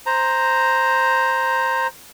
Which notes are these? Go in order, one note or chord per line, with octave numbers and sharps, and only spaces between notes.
C5 A#5